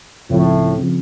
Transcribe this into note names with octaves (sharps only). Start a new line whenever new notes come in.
C#2 A2 C#3 F3 C4
C#3 F3 C4